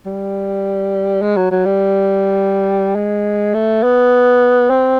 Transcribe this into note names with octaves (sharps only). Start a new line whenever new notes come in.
G3
G#3
F#3
F#3
G3
G#3
A3
B3
C4